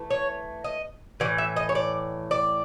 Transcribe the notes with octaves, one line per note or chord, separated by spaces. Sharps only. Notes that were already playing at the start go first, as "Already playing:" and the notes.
Already playing: E3 A3
C#5
D#5
A2 E3 D5
E5
D#5
C#5
D5
D5